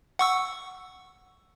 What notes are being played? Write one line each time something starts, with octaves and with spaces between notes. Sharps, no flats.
F#5 C#6 E6